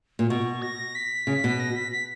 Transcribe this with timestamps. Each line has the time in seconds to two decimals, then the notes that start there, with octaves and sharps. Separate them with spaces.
0.19 A#2
0.30 B2 C#6
0.62 A#6
0.95 B6
1.27 C#3
1.44 B2
1.60 A#6
1.76 B6
1.92 B6